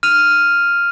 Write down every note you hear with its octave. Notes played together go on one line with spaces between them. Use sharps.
F6 D#7 F7